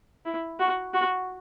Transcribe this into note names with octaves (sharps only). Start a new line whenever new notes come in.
E4
F#4
F#4